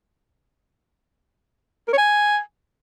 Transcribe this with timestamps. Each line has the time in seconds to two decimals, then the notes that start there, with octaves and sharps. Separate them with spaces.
1.88 A#4
1.93 C#5
1.98 G#5